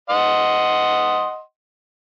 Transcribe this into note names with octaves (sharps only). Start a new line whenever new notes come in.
D#5 F#5 C6